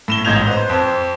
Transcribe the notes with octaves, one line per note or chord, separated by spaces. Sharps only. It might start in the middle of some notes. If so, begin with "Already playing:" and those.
A2 E7 G7
A1 G#2 D#4 G6 G#6 F7
B4 C5
F2 C5